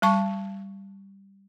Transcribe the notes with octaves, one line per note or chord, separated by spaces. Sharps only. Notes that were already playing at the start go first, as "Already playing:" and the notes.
G3 A5 C#6